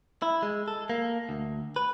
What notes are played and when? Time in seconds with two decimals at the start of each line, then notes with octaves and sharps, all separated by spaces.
0.22 E4
0.43 G#3
0.68 A4
0.90 A#3
1.29 D2
1.76 B4